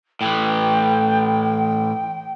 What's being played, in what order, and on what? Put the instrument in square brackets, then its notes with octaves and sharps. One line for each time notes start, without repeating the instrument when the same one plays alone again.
[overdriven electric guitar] A2 E3 [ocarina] G5